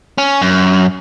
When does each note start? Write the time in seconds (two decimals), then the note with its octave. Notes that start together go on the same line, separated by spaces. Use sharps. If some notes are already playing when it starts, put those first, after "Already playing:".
0.18 C#4
0.42 F#2